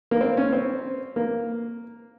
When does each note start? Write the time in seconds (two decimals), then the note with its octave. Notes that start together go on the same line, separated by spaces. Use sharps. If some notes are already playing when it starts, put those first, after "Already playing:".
0.11 A#3
0.21 C4
0.37 C#4
0.53 C4
1.16 A#3